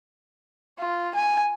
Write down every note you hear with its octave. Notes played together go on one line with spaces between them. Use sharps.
F4
G#5